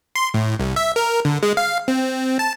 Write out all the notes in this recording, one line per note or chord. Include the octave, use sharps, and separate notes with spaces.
C6
A2
C2
E5
A#4
D3
G#3
F5
C4
A5